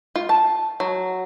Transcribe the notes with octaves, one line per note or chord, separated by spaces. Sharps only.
F4
A5
F#3